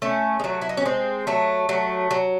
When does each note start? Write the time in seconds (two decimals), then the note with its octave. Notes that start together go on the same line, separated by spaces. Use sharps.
0.02 A3 C#4
0.40 G#3
0.44 F#3 A3
0.62 E4
0.69 D#4
0.77 C#4
0.85 G#3 C4
1.27 F#3 A3
1.69 F#3 A3
2.11 F#3